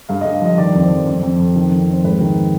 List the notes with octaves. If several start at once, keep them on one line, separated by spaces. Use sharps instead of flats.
G2 F5
G2 D#5
F5
F3 D#5
D#3 D5
F2
C5
F2
F2
F2
F2
D#3
F2
F2
C5
G#2 B4
D#3